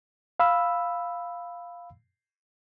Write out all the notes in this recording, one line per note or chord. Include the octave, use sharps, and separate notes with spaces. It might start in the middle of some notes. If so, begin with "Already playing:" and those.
F5 B5 E6